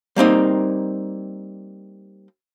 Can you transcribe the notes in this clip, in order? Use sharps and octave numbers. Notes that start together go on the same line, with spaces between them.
G3 A#3 C4 D#4